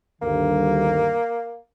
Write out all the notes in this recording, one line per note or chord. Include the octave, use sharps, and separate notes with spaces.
D2 G2 D#3 A#3